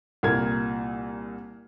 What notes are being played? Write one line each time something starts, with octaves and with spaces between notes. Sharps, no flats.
C2 A#2 A#4 G#6